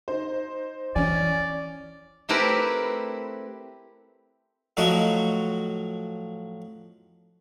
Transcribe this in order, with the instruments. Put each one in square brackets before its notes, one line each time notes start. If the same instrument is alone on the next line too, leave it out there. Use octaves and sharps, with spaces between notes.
[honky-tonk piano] D#4 C5
[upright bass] E3 [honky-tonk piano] C#4 G#5 [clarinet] D5
[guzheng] A3 C4 E4 G4 A#4 B4
[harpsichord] A2 F3 F#3 F#4 D#5